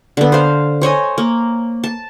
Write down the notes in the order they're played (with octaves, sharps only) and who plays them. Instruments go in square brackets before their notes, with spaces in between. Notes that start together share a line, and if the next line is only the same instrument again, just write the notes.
[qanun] D3 B3
C5 F5
C5 C#5 D#5 G#5
A#3
A5